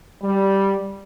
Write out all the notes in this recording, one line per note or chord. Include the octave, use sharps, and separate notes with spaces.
G3